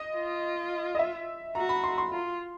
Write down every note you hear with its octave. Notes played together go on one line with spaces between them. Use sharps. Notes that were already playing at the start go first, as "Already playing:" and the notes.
Already playing: D#5
F4
D#5
E5
F#4 A#5
B5
C6
C6
F4